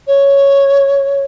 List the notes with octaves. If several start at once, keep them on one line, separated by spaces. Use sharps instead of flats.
C#5